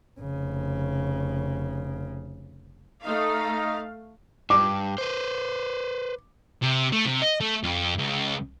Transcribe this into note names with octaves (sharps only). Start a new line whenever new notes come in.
F1 C#3
A3 D#4 F5
G2 D6
B4 C5
C3
A3
C3
D#5
A3
F2
C#2